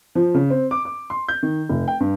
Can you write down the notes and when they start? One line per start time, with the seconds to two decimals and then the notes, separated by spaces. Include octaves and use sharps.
0.15 F3
0.34 C#3
0.50 C4
0.71 D6
0.85 D6
1.10 C6
1.28 G6
1.43 D#3
1.69 F1
1.88 G5
2.00 G2